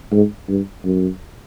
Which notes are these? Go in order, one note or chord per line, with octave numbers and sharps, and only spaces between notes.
G#2
G2
F#2